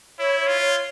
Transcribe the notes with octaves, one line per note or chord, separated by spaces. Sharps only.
E4 C#5
C#5
F4
C#5